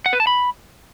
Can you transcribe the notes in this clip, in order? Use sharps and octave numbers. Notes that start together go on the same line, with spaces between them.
F#5
B4
A5
B5